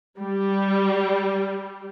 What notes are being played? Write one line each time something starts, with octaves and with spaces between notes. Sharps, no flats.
G3